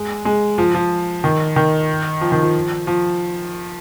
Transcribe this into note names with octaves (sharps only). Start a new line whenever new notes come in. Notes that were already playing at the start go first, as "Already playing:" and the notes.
Already playing: G#3
G#3
F3
F3
D#3
D#3
F3
D#3
F3
F3